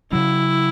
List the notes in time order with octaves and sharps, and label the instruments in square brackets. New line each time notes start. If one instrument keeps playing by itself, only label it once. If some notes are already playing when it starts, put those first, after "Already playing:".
[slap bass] C#3 F#3 C#4 [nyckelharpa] E4